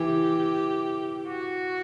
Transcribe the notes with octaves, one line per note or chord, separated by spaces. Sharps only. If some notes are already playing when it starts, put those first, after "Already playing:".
Already playing: E3 G4
F#4